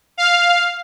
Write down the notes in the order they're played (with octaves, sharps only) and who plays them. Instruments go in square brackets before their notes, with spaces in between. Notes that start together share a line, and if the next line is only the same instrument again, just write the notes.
[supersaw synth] F5